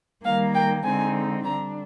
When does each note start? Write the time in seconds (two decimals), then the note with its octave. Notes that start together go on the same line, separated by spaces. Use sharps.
0.24 D#3 G3 A#3 F5
0.54 G5
0.84 D3 G#3 C4 D#4 G#5
1.43 D3 G3 D4 A#5